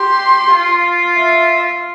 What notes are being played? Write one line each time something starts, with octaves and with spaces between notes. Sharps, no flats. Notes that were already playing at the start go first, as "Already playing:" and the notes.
Already playing: G4 C6
F4
E5